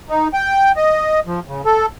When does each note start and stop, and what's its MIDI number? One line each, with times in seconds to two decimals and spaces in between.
0.10 0.28 63
0.33 0.72 79
0.76 1.20 75
1.27 1.40 53
1.48 1.62 49
1.65 1.86 69